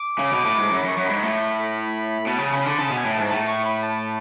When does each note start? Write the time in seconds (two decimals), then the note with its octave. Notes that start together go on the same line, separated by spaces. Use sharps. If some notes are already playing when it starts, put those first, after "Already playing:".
Already playing: D6
0.19 C#3
0.32 B2
0.45 A2
0.58 G#2
0.71 F#2
0.78 B5
0.84 F#2
0.88 C#6
0.97 F#2
1.05 G#2 B5
1.23 A2
2.27 B2 A5
2.39 C#3
2.53 C#3 B5
2.66 D3
2.78 C#3 A5
2.91 B2
2.96 G#5
3.05 A2
3.14 G#2 A5
3.30 A2 A5
3.48 C#6
3.65 B5
3.83 A5